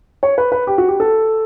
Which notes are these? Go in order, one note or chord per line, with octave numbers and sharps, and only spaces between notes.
C#5
B4
B4
G4
F#4
G4
A4